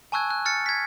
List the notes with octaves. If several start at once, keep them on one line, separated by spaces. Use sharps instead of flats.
G#5 A5 C#6 E6 F#6 G#6
F#6
F6 A6 C#7
G#6 B6